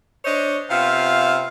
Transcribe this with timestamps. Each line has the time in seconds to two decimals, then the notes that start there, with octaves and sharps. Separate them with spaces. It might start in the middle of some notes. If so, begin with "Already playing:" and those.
0.25 D4 C5 C#5 D#5
0.70 C3 B3 F4 E5 F5